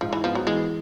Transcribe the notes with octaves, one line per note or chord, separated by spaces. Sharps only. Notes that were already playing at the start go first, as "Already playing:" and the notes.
G#2 F3
E3
F3 B3
F#3
E3 G#3